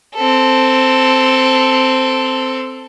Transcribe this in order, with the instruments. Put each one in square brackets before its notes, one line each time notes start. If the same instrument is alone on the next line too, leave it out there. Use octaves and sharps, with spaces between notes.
[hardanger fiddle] C4 A4